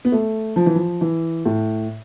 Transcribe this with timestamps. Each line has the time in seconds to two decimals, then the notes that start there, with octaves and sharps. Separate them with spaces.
0.05 B3
0.12 A3
0.56 F3
0.66 E3
0.75 F3
1.01 E3
1.46 A2